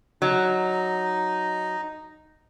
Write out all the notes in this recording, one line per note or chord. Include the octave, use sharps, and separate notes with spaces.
F#3 D#4